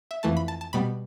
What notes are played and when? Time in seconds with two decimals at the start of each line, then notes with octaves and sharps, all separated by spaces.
0.11 E5
0.23 F2 E3 A3 A5
0.37 B5
0.48 A5
0.61 A5
0.73 B2 G3 B3 B5